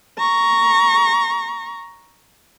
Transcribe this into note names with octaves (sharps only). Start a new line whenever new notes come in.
A#5 C#6